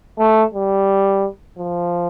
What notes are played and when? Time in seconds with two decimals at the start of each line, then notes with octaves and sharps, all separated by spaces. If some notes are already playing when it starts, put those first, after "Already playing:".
0.19 A3
0.54 G3
1.58 F3